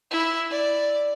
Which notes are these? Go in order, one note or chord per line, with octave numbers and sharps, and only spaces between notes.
E4
D5